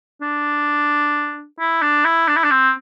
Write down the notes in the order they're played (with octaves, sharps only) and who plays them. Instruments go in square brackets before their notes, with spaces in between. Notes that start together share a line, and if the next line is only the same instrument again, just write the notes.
[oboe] D4
E4
D4
E4
D4
E4
D4
C4